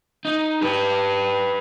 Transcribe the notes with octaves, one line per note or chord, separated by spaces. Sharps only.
D#4
G4 B4